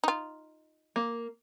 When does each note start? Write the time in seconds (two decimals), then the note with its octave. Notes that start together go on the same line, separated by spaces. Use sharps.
0.04 D#4 F4
0.96 A#3